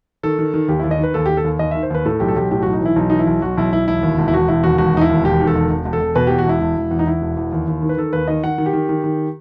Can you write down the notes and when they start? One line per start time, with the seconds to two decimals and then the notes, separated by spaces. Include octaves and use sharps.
0.23 D#3 A4
0.39 D#3
0.54 D#3
0.68 D#2 G4
0.80 D#2 E4
0.91 D#5
0.99 D#3 B4
1.14 D#2 A4
1.26 D#2 G4
1.37 A4
1.44 D#2
1.59 D#2 D#5
1.71 D#3 E5
1.83 C5
1.90 D#2 B4
2.05 A2 A4
2.20 B1 G4
2.28 A4
2.36 B1 G4
2.51 A2 G4
2.62 B1 F#4
2.73 D#4
2.81 E3 E4
2.96 B1 D#4
3.10 E3 D#4
3.19 E4
3.27 B1
3.42 B1 F#4
3.57 B1 E4
3.72 B1 E4
3.87 E1 E4
4.03 D#2
4.18 E1
4.28 E4
4.33 E1 F#4
4.48 E1 E4
4.64 D#2 F#4
4.78 E1 F#4
4.94 E1 D#4
5.01 E4
5.10 D#2
5.24 E1 G4
5.40 D#3
5.47 A4
5.55 E1
5.70 E1
5.85 E1
5.93 A4
6.00 E1
6.15 B2 B4
6.27 E2 G4
6.38 F#4
6.46 E1 E4
6.61 E1
6.77 E1
6.91 E2
6.99 D#4
7.07 E2 E4
7.22 E1
7.37 E2
7.52 D#2
7.67 D#2
7.82 D#3
7.89 B4
7.97 D#3 A4
8.13 D#2 B4
8.28 D#3 D#5
8.44 D#3 F#5
8.58 D#3
8.66 G4
8.73 D#3
8.89 D#3
9.04 D#3